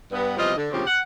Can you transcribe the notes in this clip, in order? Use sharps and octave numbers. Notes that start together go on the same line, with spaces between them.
G2 B3
E2 C3 F3 G3 F4 D#5
D3
D2 A#2 C#3 F3 C4 G4
F#5